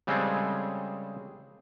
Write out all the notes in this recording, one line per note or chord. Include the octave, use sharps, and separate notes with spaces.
C#3 G3 G#3 C4 G#4 A4